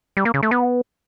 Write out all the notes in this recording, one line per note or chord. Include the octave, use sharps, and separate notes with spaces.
G3
A#3
C#3
A3
B3